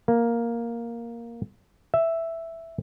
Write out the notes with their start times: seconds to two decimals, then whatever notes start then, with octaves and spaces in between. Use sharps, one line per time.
0.08 A#3
1.94 E5